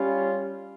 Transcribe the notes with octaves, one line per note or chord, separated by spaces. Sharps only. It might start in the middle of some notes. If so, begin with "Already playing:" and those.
Already playing: G3 C#4 F4